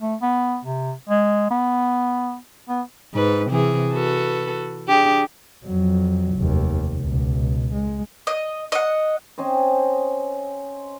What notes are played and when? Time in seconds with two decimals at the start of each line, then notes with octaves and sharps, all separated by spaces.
0.01 A3
0.22 B3
0.65 C3
1.09 G#3
1.50 B3
2.69 B3
3.14 G#2 B4
3.51 C3 E3 G#4
3.93 F#4 A4 B4
4.87 D4 G4 G#4
5.66 F2 F#3
6.37 F1 D#2
6.99 C#2 B2
7.73 G#3
8.27 D#5
8.72 D#5 F#5
9.38 C4 C#4 C5 D#5